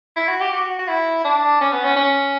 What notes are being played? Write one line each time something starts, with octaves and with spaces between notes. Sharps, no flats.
E4
F#4
G4
F#4
F#4
E4
D4
C#4
B3
C#4
C#4